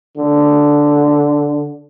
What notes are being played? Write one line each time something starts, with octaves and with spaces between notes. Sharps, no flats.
D3